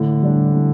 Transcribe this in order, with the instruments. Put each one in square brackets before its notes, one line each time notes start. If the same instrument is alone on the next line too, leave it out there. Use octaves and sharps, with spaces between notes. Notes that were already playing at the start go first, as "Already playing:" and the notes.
Already playing: [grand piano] A2 [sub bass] D3
[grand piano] G3 D4
A2